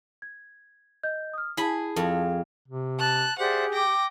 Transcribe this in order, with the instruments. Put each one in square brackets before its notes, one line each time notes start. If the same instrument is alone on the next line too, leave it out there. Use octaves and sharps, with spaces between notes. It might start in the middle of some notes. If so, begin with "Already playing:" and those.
[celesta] G#6
D#5 G6
D#6 F6
[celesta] E4 A5 [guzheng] G#4 B5
[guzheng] F2
[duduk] C3
[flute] A5 [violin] F#6
[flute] G4 [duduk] G#4 [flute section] C5 D5 E5 [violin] F#5
[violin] G5 A#6 [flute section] D6